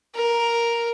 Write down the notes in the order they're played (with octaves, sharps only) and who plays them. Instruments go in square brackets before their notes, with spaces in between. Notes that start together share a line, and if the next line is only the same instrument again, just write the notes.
[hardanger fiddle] A#4